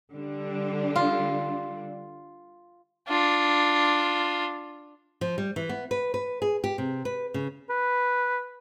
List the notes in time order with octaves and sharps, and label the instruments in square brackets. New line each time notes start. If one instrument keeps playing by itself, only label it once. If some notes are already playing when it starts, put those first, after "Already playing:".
[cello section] D3 G3 D4
[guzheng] F4
[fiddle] D4 F4
[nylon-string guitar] F3
G3
E3
B3
B4
B4
G#4
G4
C3
B4
C#3
[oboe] B4